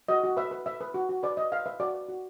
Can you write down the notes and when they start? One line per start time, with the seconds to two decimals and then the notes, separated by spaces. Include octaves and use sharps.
0.08 F#4 D#5
0.24 F#4
0.37 B4 E5
0.51 B4
0.66 B4 E5
0.81 B4
0.94 F#4
1.09 F#4
1.23 B4 D5
1.37 B4 D#5
1.52 B4 F5
1.66 B4 E5
1.80 F#4 D5
1.94 B4
2.09 F#4